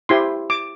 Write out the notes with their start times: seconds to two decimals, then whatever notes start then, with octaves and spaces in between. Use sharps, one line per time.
0.09 E4 G4 C5 C6
0.50 D6